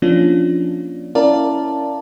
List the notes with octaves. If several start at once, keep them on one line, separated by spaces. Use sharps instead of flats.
F3 A#3 C#4 D4 F4
C#4 E4 A#4 D5 F5 A5